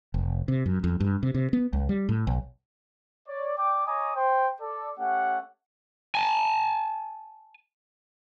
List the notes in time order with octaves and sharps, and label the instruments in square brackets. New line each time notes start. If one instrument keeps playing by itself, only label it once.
[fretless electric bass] F1
C3
F#2
F2
G2
C3
C3
B3
C#2
G3
A2
B1
[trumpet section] C#5 D5
D5 G5 D6
C#5 D#5 G#5 A#5 D6 D#6
C5 G5
A4 D5
A3 C#4 G4 F#5
[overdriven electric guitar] G#5 A5